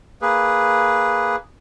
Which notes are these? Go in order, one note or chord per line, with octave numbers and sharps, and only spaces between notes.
A#3 G#4 B4